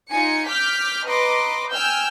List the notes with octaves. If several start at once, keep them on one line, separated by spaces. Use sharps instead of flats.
D#4 F4 G#5 C#7
D6 F6 G6 B6
B4 D#5 A#5 C6 D6
G5 G#5 E6 F6 G6